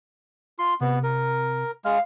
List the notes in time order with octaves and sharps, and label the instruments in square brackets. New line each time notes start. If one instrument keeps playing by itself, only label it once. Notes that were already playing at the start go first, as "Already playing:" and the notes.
[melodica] F4 [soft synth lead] C6
[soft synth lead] C3 [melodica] B3
[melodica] A#4
[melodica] G#3 [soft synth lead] F5